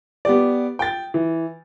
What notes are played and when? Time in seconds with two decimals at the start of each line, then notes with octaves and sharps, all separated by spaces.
0.25 B3 G4 D5
0.79 G5 A6
1.14 E3